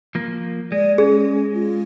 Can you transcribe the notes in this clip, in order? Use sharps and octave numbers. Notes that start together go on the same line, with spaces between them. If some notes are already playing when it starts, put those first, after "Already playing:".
F3 A#3
G#3 D5
C#4 G#4
F4